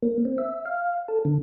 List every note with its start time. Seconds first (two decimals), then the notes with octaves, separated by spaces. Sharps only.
0.02 A#3
0.25 C4
0.38 E5
0.66 F5
1.08 A4
1.25 D3